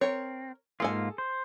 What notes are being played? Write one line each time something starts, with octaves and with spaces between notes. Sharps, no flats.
C4 A#4 C#5
G#2 A#3 F4 G#4 A4 G#5
C5